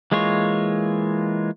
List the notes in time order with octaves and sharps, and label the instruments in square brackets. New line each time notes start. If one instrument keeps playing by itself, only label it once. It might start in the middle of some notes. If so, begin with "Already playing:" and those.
[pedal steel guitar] E3 G#3 A#3 F4 C#5